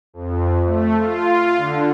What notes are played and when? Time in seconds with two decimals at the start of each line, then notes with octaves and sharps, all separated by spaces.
0.13 F2
0.65 A3
0.98 F4
1.57 D3